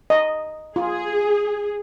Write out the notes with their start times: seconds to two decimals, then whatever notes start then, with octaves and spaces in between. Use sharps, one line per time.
0.10 D#5
0.76 F4 G#4